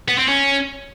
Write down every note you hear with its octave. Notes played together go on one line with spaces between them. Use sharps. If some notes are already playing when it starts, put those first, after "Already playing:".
B3
C4
C#4